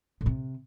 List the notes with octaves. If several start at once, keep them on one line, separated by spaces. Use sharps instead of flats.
A2
C3